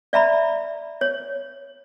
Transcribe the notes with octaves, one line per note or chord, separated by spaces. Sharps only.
D5 E5 A#5 B5
C#5